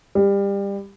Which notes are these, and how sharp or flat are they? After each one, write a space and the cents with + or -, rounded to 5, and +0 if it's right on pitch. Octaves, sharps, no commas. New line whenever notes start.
G3 +25